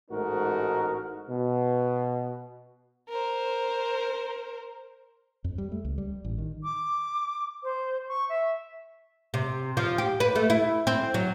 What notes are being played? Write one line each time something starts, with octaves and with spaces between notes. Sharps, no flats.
A1 G#2 A3 D#4 F#4 A#4
B2
A#4 C5
F2
G3
A3
C#2
G3
A1
D#3
D6
C5
C#6
E5
C3
F3
G4
B4
A3
E4
C4
F#3